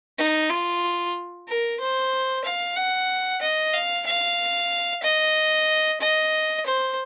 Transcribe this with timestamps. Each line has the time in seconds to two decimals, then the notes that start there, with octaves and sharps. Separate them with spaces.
0.18 D#4
0.50 F4
1.48 A#4
1.80 C5
2.44 F5
2.76 F#5
3.42 D#5
3.74 F5
4.06 F5
5.04 D#5
6.01 D#5
6.66 C5